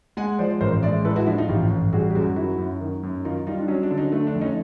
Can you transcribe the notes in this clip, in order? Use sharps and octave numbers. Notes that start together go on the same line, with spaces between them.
G#3 F#5 G#5
F3 C5 D5
A1 A#4 C5
G#3 D5 E5
A2 A4 B4
E4 F#4
F3 D4 E4
D#4 F4
A1 F4 G4
A1
G3 F#4 G#4
G4
F#2 F#4 G#4
D#3 E4 F#4
F#2
D#3
F#2
D#3 D#4 F4
G3 D#4 F4
D4
F#3 C#4 D#4
D4
D3
C#4 D#4
A3 D4
D4
F2
C#4 D#4